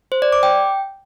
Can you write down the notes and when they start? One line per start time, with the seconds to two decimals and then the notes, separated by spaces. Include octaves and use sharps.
0.12 C5
0.22 D5
0.32 D6
0.43 G5